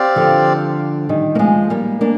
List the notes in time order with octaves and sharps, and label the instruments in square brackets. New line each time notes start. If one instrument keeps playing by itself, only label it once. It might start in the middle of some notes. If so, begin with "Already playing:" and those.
Already playing: [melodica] C4 G4 D5 F5
[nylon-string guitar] D3 F3
D#3 G3
A#3
F3 G#3
G3 A#3
A#3 D4